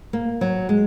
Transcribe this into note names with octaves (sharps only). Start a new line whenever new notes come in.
A#3
F#3
G#3